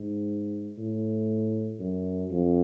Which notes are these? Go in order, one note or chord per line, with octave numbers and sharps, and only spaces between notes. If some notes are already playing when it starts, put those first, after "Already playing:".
Already playing: G#2
A2
F#2
F2